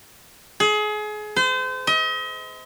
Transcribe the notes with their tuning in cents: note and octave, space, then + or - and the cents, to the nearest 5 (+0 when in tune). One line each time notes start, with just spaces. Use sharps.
G#4 +30
C5 -35
D#5 +40